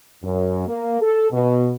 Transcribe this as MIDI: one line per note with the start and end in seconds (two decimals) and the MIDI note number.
0.23 0.64 42
0.67 0.99 58
1.02 1.27 69
1.32 1.73 47